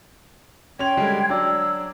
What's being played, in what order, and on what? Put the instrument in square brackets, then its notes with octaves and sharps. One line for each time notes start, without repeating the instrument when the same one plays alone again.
[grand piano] C#4 C6 F7 [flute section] G5 G#6
[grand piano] D3 G3 G#3
[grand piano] F#3 D4 D5 [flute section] E6